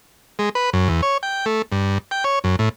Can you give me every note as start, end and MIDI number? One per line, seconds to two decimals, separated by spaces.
0.39 0.49 56
0.55 0.70 71
0.73 0.89 42
0.89 1.01 40
1.02 1.18 73
1.23 1.45 79
1.46 1.62 57
1.72 1.98 43
2.11 2.24 79
2.24 2.39 73
2.44 2.56 42
2.59 2.69 45